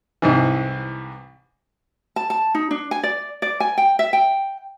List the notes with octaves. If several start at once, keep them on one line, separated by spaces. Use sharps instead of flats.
C2 G#2 E3
A5
A5
D#4
D4
G#5
D5
D5
G#5
G5
E5
G5